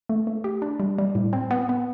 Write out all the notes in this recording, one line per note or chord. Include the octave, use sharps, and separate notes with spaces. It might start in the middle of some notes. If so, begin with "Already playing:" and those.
A3
A3
G4
D4
G3
G3
A2
C4
B3
B3